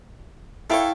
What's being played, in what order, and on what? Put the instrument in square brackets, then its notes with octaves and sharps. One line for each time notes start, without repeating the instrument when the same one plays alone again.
[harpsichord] E4 A4 C#5 [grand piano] E5 F5 G5